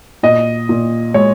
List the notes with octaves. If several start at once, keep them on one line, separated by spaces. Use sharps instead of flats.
A#2 D#5
A#2
G#3 C#5